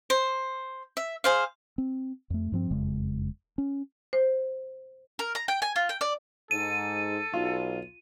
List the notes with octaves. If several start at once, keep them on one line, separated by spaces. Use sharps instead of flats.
C5
E5
G#4 C5 F5
C4
F2 A3
G2 F3 C4
F#1 F2 C#3 G#3
C#4
C5
A#4
A#5
G5
G#5
F4
G5
D5
G#2 A4 D#7
B1 F4